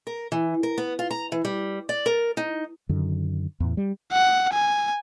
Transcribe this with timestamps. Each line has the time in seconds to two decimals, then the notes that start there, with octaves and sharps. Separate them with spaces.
0.07 A#4
0.32 E3
0.63 A#4
0.78 B3
0.99 F4
1.11 A#5
1.32 E3
1.45 G3
1.89 D5
2.06 A#4
2.37 D#4
2.89 F#2 D3 D#3
3.60 E2 A2
3.77 G3
4.12 F#5
4.54 G#5